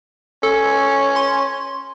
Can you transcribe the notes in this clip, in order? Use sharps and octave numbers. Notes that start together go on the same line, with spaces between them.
C#4 A4
C6